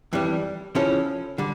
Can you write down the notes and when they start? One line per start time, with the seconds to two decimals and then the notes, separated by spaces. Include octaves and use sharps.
0.13 F2 E3 G3
0.75 C#3 F3 C#4 E4 A4
1.38 D3 G3